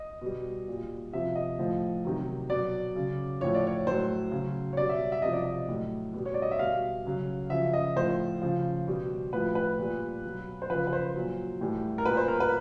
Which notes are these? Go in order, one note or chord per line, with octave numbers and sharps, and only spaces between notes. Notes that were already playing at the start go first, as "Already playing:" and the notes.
Already playing: D#5
B2 G3
A#2 G3
C3 F3 E5
D#5
A2 F3
C3 D#3 F#3
B2 F#3 D5
C#3 F#3
A2 F3 C#5
D5
C#5
A2 F#3 C5
C#3 F#3
C#5
B2 G3 D5
E5
E5
C3 F3 D#5
D5
D#5
A2 F#3
B2 G3
C#5
D5
D#5
E5
B2 G3 F5
C#3 F#3
C#3 F3 E5
D#5
A2 F3 C5
C#3 F3
B2 G3
A2 F3 B4
B4
A#2 G3
B2 F#3
C5
C#3 F3 B4
B4
C5
A#2 F#3
A2 E3 G3
A#4
A#2 G3 B4
C5
A#4
B4